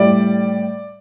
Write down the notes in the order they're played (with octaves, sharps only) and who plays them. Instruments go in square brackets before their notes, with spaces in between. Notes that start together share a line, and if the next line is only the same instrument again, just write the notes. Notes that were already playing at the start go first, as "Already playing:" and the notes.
Already playing: [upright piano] A2 G3 D5